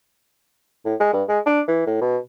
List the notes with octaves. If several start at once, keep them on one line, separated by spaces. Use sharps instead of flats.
A2
G#3
G2
G#3
D4
E3
A2
B2